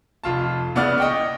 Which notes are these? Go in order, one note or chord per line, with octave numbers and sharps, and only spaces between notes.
F1 F4 A5
C#3 B3 E4 D5 F6
D#5 G5 C#6